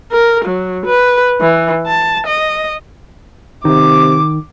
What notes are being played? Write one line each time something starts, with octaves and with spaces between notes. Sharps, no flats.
A#4
F#3
B4
E3
A5
D#5
C3 D#3 D6